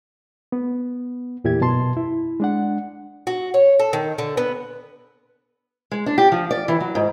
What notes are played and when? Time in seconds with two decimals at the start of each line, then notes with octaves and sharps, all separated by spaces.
0.52 B3
1.44 E2 A#2 E4 G4 E5 G#6
1.61 F#2 B2 A5 C6
1.97 E4
2.40 G#3 D4 F#5
3.27 F#4
3.54 C#5
3.80 A4
3.93 D#3
4.18 D3
4.37 B3
5.91 G#3
6.06 D4
6.18 G4
6.32 F3
6.51 D5
6.68 E3
6.80 F#3
6.95 G#2